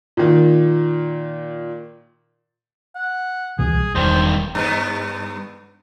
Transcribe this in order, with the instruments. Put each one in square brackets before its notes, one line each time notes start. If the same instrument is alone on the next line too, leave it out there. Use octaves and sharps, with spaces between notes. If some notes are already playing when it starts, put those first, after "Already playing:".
[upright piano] A#2 D#3
[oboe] F#5
[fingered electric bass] C#2 B2 E3 [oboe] G#4
[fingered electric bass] C2
[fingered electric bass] E1 [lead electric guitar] G2 D#3 [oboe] C5
[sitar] G2 B3